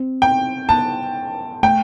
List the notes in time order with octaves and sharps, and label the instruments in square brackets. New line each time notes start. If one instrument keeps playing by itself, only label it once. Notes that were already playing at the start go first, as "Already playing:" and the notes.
Already playing: [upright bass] C4
[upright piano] G5
[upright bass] B3 [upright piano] A5
[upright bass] A3 [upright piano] G5